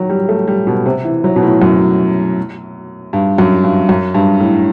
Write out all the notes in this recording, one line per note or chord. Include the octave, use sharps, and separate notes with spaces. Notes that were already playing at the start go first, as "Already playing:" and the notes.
Already playing: D#3 F#3
G3
A3
G3
B2
C3
E3
F#3
B2
A2
F#2
G2
F#2
G2
F#2
G2
A2